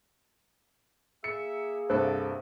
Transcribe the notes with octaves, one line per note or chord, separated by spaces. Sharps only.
A#3 G#4 E5 C#7
C2 G2 A4 C5